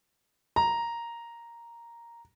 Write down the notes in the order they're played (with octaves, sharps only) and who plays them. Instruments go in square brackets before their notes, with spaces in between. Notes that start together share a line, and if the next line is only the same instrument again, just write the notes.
[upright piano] A#5